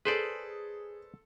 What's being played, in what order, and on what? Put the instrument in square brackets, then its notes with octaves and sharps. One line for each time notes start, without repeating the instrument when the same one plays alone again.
[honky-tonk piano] G#4 [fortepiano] A4 C6 [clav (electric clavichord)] B4 C5 D5